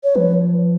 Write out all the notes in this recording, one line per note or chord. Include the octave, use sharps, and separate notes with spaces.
C#5
F3 B4